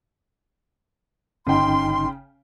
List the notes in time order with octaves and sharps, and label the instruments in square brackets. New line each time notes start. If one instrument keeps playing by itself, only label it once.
[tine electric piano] G1 D#4 [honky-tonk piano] C#3 G5 [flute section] C6